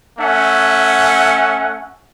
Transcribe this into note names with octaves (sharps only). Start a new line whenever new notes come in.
A3 C#4 E5 F#5